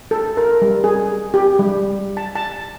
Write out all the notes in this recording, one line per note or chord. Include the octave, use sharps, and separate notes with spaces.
A4
A#4
G3
G#4
G4
G3
A5
A5